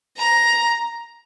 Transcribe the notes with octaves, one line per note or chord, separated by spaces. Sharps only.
A#5